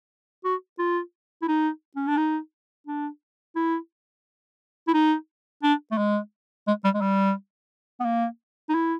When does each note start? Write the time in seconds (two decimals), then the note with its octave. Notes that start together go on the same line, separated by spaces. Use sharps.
0.44 F#4
0.79 F4
1.42 E4
1.48 D#4
1.96 C#4
2.07 D4
2.17 D#4
2.87 D4
3.56 E4
4.88 E4
4.94 D#4
5.63 D4
5.92 A3
5.98 G#3
6.67 G#3
6.84 G3
6.95 G#3
7.01 G3
8.00 B3
8.05 A#3
8.69 D#4
8.74 E4